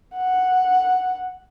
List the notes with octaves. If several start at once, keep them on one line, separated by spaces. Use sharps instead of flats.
F#5